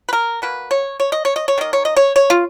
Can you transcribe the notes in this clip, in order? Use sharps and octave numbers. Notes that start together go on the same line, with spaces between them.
B4
A#4
B2 A#3 B4
C#5
C#5
D#5
C#5
D#5
C#5
D#3 A#3 D#5
C#5
D#5
C#5
C#5
F4